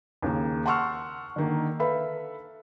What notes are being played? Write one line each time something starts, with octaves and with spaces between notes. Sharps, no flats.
D#2 C#3 A#3
F#5 A5 C6 C#6 E6 F6
D3 D#3 A#3
A4 B4 E5 F5 B5